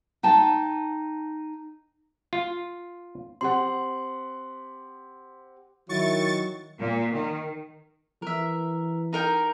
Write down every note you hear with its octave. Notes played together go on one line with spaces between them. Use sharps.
D#4 G5 A5
F4
C4 G4 F#5 C6
D#3 F#3 E4 C#6 A6
A#2
D#3
E3 A#4 E5
D#4 A#4 G5